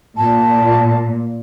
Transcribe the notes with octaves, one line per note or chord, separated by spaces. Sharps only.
A#2 A5